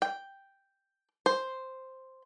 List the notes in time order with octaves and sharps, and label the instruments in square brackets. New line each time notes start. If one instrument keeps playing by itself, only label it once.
[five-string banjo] G5
C5